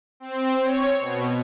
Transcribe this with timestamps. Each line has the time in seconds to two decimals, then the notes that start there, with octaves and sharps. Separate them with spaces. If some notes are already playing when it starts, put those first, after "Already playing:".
0.20 C4
0.61 C#5
0.99 B2